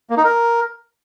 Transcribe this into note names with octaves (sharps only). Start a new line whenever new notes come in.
A#3
D#4
A#4